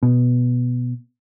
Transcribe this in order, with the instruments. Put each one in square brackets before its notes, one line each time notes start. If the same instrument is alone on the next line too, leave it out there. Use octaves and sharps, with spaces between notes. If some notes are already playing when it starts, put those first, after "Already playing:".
[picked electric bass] B2